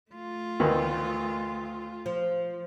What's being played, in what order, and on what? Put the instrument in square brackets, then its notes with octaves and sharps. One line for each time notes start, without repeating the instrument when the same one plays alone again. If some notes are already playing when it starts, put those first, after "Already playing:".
[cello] A3 F4
[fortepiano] D2 D#3 E3
[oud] F3